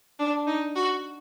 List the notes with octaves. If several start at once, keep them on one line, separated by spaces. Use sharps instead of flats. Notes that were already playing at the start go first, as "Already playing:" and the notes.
D4
D#4
F#4